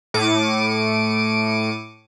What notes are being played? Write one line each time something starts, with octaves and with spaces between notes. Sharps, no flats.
A2 D6 C#7 D#7